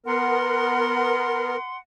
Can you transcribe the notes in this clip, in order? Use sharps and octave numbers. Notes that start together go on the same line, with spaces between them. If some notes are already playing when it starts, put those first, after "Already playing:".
B3 A#4 F#5 C6